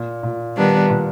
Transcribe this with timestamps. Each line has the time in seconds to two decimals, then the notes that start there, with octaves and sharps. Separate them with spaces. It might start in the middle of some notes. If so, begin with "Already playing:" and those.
Already playing: A#2
0.23 A#2
0.56 D#3 G3 B3 D4
0.90 A#2